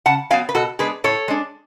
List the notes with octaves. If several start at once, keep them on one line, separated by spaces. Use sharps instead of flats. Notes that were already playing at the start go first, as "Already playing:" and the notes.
C#3 F#5 A5
F#3 B3 F5 G#5
B4
B2 F#4 A4
G#3 B3 D4 G#4 B4
A2 A4 C#5
G#3 D4